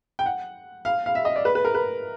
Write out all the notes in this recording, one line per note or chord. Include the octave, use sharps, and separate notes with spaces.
G5
F#5
F5
F5
E5
D#5
D5
B4
B4
A#4
B4